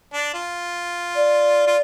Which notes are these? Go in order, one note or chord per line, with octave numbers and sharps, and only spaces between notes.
D4
F4
D5
F4